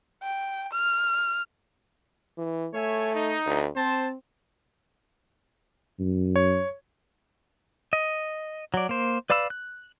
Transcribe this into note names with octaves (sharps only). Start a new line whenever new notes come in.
G5
F6
E3
A3 C#5 E5 G#5
D#4
D2
C4 C5 A5
F#2
C#5
D#5
F#3 D5
A#3 C5
B4 D5 F5 B5 E6
F#6